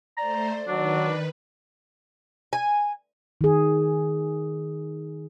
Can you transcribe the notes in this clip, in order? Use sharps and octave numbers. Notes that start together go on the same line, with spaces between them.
A3 C5 D5 A#5
D#3 F#3 D4 B4
G#5
D#3 G#4